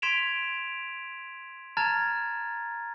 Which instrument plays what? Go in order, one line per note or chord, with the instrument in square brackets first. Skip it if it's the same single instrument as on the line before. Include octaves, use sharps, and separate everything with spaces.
[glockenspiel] C6 G#6 B6 D7 E7 F7
A5 A#5 F6 G#6 A6